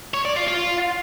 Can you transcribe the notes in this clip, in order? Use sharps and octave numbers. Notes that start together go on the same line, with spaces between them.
C#5
D5
F4
F4